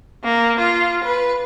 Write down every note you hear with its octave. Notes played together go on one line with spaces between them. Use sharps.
A#3
F4
B4